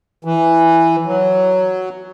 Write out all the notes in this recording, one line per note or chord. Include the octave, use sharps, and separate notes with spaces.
E3
F#3